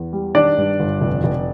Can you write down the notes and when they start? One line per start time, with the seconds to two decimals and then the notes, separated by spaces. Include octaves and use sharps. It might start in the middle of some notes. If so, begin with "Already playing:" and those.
Already playing: E2
0.13 G3
0.35 D#3 D4 D5
0.57 G2
0.80 G1
1.01 F1
1.24 F1